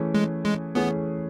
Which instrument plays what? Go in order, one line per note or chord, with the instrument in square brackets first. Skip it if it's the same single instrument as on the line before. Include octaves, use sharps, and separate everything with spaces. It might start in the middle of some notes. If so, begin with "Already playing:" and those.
Already playing: [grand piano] E3 A3 C#4 G#4
[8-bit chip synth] G#3
G#3
[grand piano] E3 A3 C#4 G#4 [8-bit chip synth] B3